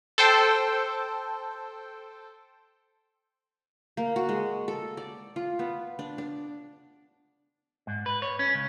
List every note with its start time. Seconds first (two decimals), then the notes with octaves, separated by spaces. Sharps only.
0.18 A4 C5 G5
3.97 A#3
4.16 F#4
4.29 G#3
4.68 A4
4.97 D5
5.36 F4
5.59 B3
5.99 D4
6.18 D4
7.87 G#2
8.06 B4
8.22 C#5
8.39 C#4
8.54 C#2